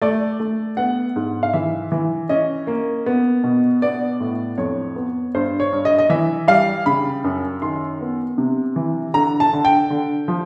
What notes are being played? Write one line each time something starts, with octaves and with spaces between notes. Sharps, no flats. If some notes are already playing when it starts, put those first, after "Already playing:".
A3 D5
A3
B3 F#5
G#2
F5
E3 E5
E3
C#4 D#5
A#3
B3
B2
B3 D5
A2
F2 C#5
B3
G2 C5
C#5
G2
D#5
D#5
E3 E5
G3 F5
C#3 B5
F#2
D#3 C6
B3
C3
E3
D3 A#5
A5
D3
G5
D3
F3